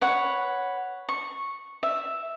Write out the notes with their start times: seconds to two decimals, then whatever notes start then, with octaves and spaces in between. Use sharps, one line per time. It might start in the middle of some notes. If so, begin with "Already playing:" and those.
0.01 B4 C#5 F#5
1.09 C#6
1.83 E5